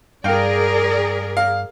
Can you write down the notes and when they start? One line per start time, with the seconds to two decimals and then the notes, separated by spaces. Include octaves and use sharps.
0.24 G2 G#4 A#4 D5 F5 G5
1.37 F5